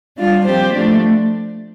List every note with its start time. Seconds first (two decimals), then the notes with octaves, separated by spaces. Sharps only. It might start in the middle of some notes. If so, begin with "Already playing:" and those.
0.16 G3 D4 F4
0.44 F3 C4 G4 C5
0.73 F3 A3 D4